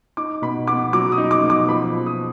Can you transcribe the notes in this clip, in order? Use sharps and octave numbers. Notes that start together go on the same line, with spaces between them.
D#4 D6
B2 B5
B3 D6
F#3 D6
D#6
D#4
D6
B2
D6
F3 B5
F3
D#6